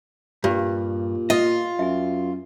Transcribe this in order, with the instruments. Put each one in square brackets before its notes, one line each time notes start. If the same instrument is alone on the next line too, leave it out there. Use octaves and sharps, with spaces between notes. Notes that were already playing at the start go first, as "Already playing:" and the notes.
[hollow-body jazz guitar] G2 [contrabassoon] A#2 [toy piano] G4
[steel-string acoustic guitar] F4 [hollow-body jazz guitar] D#5
[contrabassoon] F#2 [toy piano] E5 G#5